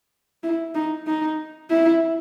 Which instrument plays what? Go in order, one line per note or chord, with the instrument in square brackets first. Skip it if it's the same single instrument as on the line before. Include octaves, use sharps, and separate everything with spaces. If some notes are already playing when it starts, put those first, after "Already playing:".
[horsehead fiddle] E4
D#4
D#4
E4